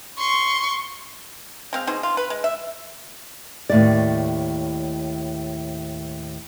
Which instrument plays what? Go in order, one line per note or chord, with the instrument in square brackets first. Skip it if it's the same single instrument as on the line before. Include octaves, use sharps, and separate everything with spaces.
[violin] C6 C#6
[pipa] G#3 C4 F5
B2 D#4 G#4 C5
F4
B4
G#3
E5
[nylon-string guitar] D#2 A2 D5